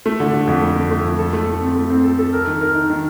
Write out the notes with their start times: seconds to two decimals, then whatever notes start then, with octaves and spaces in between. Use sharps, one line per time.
0.06 A3
0.20 D3
0.33 D3
0.47 F2
0.61 A3
0.76 A3
0.91 A3
1.04 F2
1.19 A4
1.33 A3
1.47 A3
1.61 C4
1.76 A3
1.90 C4
2.04 A4
2.19 A4
2.33 A#4
2.47 D#3
2.61 A#4
2.75 D#4
2.90 D#3